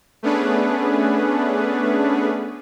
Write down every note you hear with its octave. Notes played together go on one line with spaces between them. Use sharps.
A3 B3 C#4 D4 G#4 B4